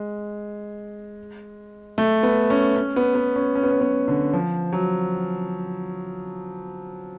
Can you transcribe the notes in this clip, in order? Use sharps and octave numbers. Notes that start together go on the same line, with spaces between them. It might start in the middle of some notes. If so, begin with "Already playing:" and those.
Already playing: G#3
A3
B3
C#4
C#4
B3
B3
C#4
C#4
B3
C#4
B3
D3
F3
F#3